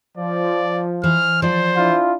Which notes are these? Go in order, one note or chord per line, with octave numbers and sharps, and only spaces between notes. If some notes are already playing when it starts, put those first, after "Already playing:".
F3 D5
E3 C5 F6
F3 C5 D5
D4 E4 F4